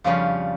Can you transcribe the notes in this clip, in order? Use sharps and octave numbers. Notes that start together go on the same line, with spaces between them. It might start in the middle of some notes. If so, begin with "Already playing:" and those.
F2 C#3 G3 C#4 F4